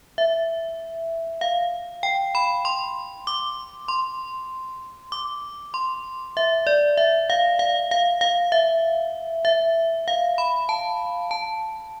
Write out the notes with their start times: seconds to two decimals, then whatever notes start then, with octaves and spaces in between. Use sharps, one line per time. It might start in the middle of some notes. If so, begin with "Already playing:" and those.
0.18 E5
1.41 F5
2.03 G5
2.35 B5
2.65 C6
3.27 D6
3.88 C6
5.12 D6
5.74 C6
6.37 E5
6.67 D5
6.97 E5
7.30 F5
7.59 F5
7.91 F5
8.21 F5
8.52 E5
9.45 E5
10.08 F5
10.38 B5
10.69 A5
11.31 A5